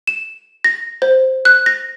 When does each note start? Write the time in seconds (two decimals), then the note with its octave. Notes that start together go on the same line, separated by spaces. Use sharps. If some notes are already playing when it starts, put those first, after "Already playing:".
0.07 E7
0.64 A#6
1.02 C5
1.45 F#6
1.66 A#6